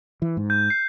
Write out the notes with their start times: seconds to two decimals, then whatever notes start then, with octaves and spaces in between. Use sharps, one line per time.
0.22 E3
0.37 G#2
0.50 G6
0.70 C7